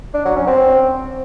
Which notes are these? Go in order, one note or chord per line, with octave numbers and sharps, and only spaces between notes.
D4
F#3
C#4
C4